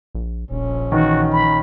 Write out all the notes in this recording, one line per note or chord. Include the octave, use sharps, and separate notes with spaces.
A#1
D#1 A#1 C#4
D#3 E3 F#4
B5